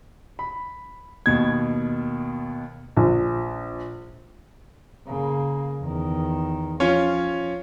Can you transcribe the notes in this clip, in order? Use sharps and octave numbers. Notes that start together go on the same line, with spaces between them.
B5
D#2 B2 G#6
A#1
C#3 A#3
E2 D#3
F3 C#4 F4 C#5